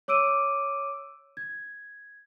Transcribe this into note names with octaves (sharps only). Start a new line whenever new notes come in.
C#5 D6 E6 D7 D#7
G#6